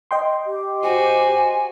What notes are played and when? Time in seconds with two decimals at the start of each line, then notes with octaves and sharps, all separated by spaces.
0.11 D#5 G5 C6
0.46 G4
0.83 F#4 C5 G#5